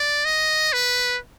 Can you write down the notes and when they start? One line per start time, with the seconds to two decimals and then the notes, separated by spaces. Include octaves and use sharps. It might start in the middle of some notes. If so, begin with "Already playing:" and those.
Already playing: D5
0.25 D#5
0.73 B4